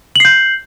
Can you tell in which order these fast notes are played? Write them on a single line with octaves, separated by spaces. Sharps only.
F#7 C7 G6